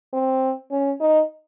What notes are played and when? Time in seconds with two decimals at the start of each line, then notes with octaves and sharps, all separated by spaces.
0.13 C4
0.71 C#4
1.00 D#4